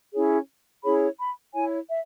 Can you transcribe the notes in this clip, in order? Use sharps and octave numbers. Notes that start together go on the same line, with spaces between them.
C#4 E4 G#4 C#5
C#4 E4 G#4 C#5 B5
B5
E4 C#5 G#5
E5